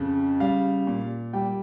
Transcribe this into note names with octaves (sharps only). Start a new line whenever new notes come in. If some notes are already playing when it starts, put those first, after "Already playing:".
Already playing: F2 C#3
G3 F5
A#2
G3 G5